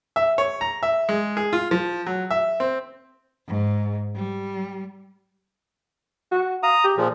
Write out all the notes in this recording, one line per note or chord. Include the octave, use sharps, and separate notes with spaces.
E5
C#5
A#5
E5
G#3
G#4
F4
F3
F#3
E5
C4
G#2
G3
F#4
F5 A#5 D#6
G4
A#2 F3 G#4